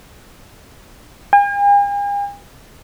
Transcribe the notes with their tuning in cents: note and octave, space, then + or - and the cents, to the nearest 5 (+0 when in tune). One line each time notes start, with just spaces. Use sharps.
G#5 -45